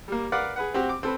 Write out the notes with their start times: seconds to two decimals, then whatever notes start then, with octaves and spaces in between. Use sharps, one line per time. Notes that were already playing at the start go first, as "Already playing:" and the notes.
0.08 G3 A#3
0.32 A#4 B4 D5 F5 F#5 B5
0.56 G#4 B4 F#5
0.74 C4 F#4 G4
0.89 D6
1.03 C4 A4 B4